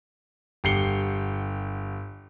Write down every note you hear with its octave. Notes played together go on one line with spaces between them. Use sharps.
G1 G4 C7 C#7 G7